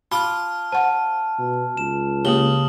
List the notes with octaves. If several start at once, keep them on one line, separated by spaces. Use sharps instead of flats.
F4 A5 B5 C6 D6 F6
C5 F#5 A5
B2
C#2 E7
C#3 A#3 G4 D#6 F#7 G7